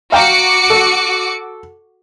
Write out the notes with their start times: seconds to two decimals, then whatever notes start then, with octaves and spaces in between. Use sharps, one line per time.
0.12 F#4 F5 G5 A#5 D6 C#7
0.70 A4